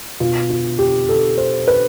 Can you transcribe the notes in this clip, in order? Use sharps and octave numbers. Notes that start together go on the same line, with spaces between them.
B2 B3 F4
F4
G4
A4
C5
B4